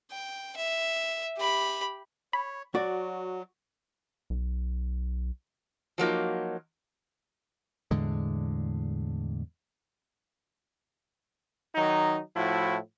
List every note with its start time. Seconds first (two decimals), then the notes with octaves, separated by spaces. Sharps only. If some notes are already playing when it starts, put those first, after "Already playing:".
0.11 G5
0.56 E5
1.38 G4 B5
2.33 C#5 B5
2.75 F#3 F#4 D5
4.30 B1
5.98 F3 F#3 A#3 D#4
7.91 E2 A2 D3 G#3
11.75 D#3 F#3 D#4
12.35 A2 F3 E4 F#4